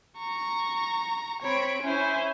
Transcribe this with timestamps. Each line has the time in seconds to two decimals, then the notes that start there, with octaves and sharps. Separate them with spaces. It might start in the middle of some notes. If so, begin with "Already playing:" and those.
0.19 A#5 C#6
1.42 C4 C#5 B5 D7
1.83 C#4 E4 C5 C#5 G#5